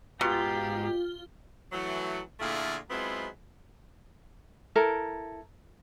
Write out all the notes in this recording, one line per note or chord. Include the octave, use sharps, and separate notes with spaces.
G#2 B2 F4 G4 A#5 G7
E3 F#3 A3
A#2 D3 A3 E4 F4 G#4
F#3 G#3 B3 C4 E4 F4
E4 A4 A#4